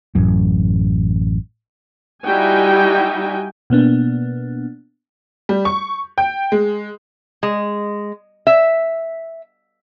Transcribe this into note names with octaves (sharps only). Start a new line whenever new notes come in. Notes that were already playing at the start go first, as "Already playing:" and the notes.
A1 F#2
G3 D#4 E4 F#4 G5 G#5
B2 A#3 B3 D4
G3
C#6
G5
G#3
G#3
E5